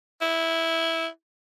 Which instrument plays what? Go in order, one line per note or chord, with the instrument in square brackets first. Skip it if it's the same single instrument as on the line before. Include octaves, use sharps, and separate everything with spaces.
[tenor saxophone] E4